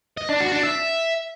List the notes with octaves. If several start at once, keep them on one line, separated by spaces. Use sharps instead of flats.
D#5
D4
F#4
D4
E5